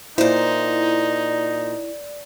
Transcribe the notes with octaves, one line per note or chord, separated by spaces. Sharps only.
A#2 D#4 E4 C5 D5